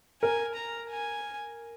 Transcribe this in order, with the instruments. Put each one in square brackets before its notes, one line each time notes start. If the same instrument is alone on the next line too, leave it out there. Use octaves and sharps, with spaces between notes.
[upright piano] A#4 [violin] G#5
[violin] A#5
G#5